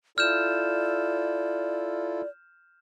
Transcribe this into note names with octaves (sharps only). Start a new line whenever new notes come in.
E4 F4 A4 D5 F6 G6 E7